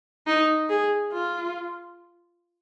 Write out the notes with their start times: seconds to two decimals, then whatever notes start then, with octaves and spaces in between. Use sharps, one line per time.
0.27 D#4
0.69 G#4
1.12 F4